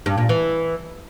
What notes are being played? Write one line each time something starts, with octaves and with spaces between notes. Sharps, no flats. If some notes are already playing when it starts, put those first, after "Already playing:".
G2
A#2
E3